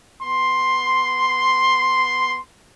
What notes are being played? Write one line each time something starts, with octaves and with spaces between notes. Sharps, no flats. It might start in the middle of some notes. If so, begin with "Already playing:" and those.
B3 C6